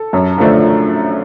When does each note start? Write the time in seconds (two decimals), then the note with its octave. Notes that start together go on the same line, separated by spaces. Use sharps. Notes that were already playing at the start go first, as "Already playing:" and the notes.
Already playing: A4
0.13 F#2
0.38 D3 F3 A3 D4